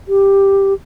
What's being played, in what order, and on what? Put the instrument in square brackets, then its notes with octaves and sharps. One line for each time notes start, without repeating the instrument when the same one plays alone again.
[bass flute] G4